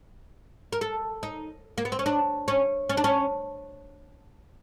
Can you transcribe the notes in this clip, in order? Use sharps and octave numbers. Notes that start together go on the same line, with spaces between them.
A#4
A4
D#4
A#3
B3
C4
C#4
D4
C#4
C#4
D4
C#4